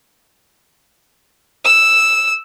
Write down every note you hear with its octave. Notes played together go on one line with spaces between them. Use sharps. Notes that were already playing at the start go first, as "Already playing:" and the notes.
E6